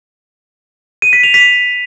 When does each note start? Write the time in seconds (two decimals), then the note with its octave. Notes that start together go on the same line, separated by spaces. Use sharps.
1.02 D#7
1.13 B6
1.23 F7
1.34 B6